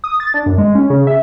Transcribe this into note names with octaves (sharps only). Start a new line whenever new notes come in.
D#6
A6
D4
F#2
G#3
C#4
C#3
E5